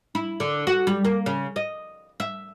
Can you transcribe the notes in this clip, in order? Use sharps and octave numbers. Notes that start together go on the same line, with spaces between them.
E4
D3
F#4
G3
A#3
C#3
D#5
E5